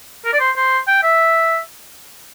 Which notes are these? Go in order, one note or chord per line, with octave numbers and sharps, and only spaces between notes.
A#4
D5
C5
C5
G5
E5